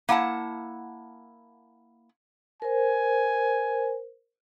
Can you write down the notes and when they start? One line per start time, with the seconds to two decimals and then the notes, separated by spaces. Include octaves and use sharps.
0.09 A#3 E4 F#5 A5
2.62 A#4 C5 G#5